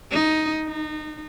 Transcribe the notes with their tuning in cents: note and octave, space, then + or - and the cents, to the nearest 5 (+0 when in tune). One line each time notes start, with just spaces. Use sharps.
D#4 +5
D#4 -30